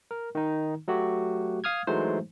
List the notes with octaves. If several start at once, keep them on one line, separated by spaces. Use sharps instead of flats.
A#4
D#3 D#4
F#3 A3 F#4 G4
F5 D#6 F6 G#6
E3 F#3 G#3 A3 D#4 C5